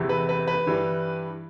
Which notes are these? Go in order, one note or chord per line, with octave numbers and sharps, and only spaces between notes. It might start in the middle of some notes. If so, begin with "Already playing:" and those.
Already playing: E2 C3 E3
B4
B4
B4
G2 E3 G3